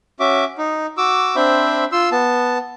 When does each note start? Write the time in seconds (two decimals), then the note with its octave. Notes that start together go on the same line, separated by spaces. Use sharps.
0.20 C#4 F#4 E5 D6
0.58 D#4
0.97 F#4 D6 E6
1.36 C4 D4 C5 E5 B5
1.92 F4 C6 E6
2.12 B3 A5